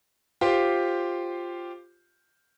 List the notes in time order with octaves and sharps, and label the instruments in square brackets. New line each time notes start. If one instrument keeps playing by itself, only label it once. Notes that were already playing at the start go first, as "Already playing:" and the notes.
[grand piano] F4 G4 C5